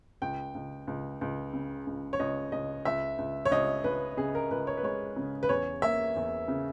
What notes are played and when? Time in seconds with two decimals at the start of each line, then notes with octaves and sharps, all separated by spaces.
0.22 C#2 G5
0.55 C#2
0.88 C#2
1.21 C#2
1.53 C#3
1.87 C#2
2.13 C#5
2.19 C#2 D#5
2.52 C#2 D#5
2.85 C#2 E5
3.18 C#2
3.45 C#5
3.51 C#2 D#5
3.84 C#2 B4
4.17 C#3 G#4
4.35 A#4
4.51 C#2 B4
4.67 C#5
4.77 B4
4.83 G#3 C#5
5.16 C#3
5.43 B4
5.49 E2 C#5
5.82 A#3 E5
6.16 E2
6.48 C#3